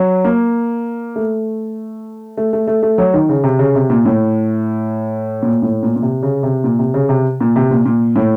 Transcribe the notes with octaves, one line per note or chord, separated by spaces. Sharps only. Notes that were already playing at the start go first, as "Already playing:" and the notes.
Already playing: F#3
A#3
A3
A3
A3
A3
A3
F#3
D#3
C#3
C3
C#3
C3
A#2
A2
A#2
A2
A#2
A#2
C3
C#3
C3
A#2
C3
C#3
C3
A#2
C3
A#2
A#2
A2